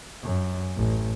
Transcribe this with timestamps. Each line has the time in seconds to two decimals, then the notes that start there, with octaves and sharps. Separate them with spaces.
0.23 F#2
0.77 A1